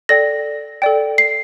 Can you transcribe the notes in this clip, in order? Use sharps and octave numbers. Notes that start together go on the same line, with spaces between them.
A4 D5 G5 A#6
A4 D5 G5
C7